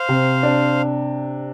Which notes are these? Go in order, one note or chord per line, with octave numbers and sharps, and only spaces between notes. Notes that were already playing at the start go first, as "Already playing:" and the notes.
Already playing: C5 F5
C3
D4